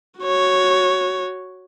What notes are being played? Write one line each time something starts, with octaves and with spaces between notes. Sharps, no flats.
F#4 C#5